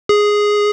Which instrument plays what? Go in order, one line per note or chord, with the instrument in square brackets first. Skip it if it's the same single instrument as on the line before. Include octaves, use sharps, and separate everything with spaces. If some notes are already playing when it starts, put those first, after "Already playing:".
[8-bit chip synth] G#4